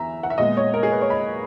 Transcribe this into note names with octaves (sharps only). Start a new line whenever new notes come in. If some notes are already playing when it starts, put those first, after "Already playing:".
Already playing: E2 E5 A#5
F#5
E5
A#2 G#3 B3 D#5
C#5
A#4
G#4
B4
C#5
B5